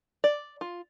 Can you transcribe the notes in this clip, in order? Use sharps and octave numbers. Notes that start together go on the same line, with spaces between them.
D5
F4